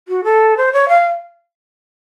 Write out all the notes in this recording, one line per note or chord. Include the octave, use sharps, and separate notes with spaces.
F#4
A4
C5
C#5
F5